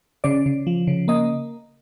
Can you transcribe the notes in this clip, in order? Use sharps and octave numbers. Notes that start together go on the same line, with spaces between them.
C#3 D5
C#3
F3
C#3
A#3 D#5